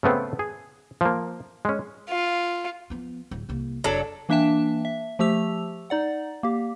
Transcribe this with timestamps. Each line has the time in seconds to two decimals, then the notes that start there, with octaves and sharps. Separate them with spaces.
0.03 C#3 A3 B3 C4
0.39 G#4
1.01 F3 A#3
1.65 G#3 C#4
2.09 F4
2.90 F3 B3
3.31 D1
3.49 C2 A#3
3.84 F1 F#3 D4 A4
4.29 E3 A#3 D4 E5 G5 A5
4.85 E5
5.19 F3 A3 G4 E6 F7
5.90 D#4 D5 F#5
6.43 A#3 G4